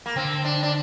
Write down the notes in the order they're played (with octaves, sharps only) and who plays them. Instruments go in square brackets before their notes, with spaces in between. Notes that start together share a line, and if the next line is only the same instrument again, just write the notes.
[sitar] A#3
[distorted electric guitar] D3 [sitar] C4
[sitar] D4
D4